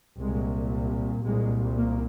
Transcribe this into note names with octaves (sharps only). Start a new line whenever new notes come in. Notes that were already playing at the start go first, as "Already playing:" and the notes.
C2 A#2 G#3
C2 A#2 G#3
A#3